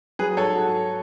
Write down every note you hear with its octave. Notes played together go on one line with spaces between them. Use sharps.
F#3 G#4 B4
G#2 A4 C#5
F#4 A4